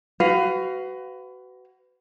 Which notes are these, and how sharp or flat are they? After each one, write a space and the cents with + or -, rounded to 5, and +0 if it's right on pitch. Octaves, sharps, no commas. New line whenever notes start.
F#4 +20 B4 +25 F5 +0